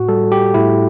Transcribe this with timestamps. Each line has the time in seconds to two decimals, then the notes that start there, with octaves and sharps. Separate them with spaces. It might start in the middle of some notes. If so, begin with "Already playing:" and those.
Already playing: A2 F#4
0.08 G3 A4
0.32 G4
0.54 A2 E4